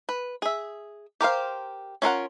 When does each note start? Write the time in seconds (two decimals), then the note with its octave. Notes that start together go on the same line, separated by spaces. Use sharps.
0.09 B4
0.42 G#4 E5
1.21 G4 A#4 C5 F5
2.02 C#4 F4 A#4 F#5